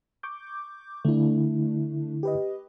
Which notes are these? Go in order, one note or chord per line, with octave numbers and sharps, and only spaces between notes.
C#6 D6 G6
D3 A3 D4 E4
G4 B4 D#5